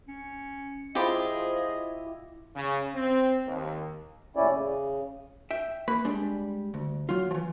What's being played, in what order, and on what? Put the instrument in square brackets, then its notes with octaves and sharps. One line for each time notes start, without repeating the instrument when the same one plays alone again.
[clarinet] C#4 [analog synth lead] C#7
[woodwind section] F3 G#4 [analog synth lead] E4 [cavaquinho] F4 G4 B5 [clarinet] D#5
[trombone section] C#3
C4
D#2
[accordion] D#2 A2 C#4 E4 D5
C#3
[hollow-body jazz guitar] E5 G5
A#3 B4 B5
G3 G#3 D4
D2
F#3 F4
E3 F3